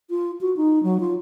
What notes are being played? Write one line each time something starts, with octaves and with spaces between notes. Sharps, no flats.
F4
F#4
D#4
F#3
F4